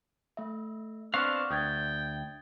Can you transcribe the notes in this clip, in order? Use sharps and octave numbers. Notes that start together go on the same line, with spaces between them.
A3 E5
B3 C4 D4 F5 C#6 F6 F#6
D2 G5 D#6 G#6 A6